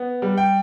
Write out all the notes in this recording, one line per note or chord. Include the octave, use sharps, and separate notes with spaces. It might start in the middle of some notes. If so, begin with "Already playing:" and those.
Already playing: B3
G3
G5